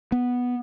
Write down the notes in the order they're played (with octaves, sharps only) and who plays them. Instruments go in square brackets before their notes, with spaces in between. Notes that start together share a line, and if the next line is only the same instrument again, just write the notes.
[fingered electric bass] B3